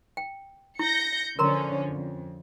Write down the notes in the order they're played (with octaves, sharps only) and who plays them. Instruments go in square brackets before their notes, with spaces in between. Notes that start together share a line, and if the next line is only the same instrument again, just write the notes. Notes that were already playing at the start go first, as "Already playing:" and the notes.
[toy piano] G5
[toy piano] E4 [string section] G6 A#6 C#7
[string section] D3 F3 C#4 [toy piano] A#4 A#5 C6
[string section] F2